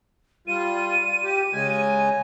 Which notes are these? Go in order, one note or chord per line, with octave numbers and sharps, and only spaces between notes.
G3 F4 D#7
G4
C#3 G#3 G#5